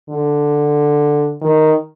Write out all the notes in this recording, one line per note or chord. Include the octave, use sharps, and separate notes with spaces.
D3
D#3